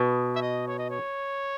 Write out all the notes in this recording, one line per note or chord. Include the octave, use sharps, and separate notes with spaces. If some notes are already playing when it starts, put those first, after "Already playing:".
Already playing: B2
E5
D#5
C#5
D#5
C#5